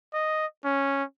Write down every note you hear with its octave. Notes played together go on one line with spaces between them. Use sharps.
D#5
C#4